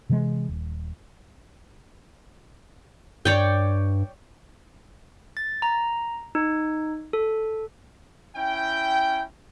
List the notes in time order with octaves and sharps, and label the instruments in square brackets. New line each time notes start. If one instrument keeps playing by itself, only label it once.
[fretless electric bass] C3 E3 G3 G#3
D#1
[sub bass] G2 [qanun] C#5 D5 G5
[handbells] A6
A#5
D#4
A4
[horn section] C#4 E4 G5